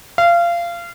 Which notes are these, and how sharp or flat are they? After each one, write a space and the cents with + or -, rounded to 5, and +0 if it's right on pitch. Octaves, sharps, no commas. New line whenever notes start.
F5 -25